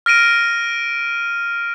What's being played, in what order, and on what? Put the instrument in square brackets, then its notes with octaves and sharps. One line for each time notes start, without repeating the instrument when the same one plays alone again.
[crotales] F6 A#6 D7 D#7